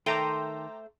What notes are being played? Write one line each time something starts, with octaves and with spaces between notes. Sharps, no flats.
D#3 A3 A4 C5 G5 A#5 C6 D6